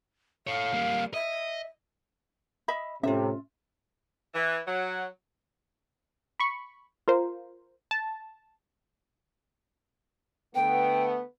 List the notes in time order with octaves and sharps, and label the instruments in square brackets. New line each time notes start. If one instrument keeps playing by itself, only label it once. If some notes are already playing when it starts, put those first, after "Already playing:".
[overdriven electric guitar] A4 C#5 [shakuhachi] F5
[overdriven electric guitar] G3 A#3
[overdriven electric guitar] D#5 [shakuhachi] E5
[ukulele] D#5 E5 B5
[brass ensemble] A2 C3 [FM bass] C#4 [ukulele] F4 E5
[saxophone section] E3
F#3
[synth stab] B5 C#6
F4 A#4 C5
A5
[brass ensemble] D3 A3 B3 [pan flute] G5